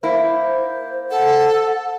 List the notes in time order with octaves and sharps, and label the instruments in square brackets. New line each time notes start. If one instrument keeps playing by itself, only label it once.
[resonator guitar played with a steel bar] A#3 E4 [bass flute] C5
[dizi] A4 [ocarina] F#5